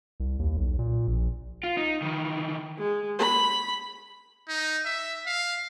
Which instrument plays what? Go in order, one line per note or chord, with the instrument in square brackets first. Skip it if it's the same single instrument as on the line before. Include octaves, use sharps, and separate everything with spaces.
[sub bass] C2
D#2
B1
A#2
A#1
[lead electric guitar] F4
D#4
D#3 E3
[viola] G#3
B5
[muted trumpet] D#4
E5
F5